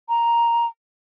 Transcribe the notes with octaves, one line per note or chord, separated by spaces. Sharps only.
A#5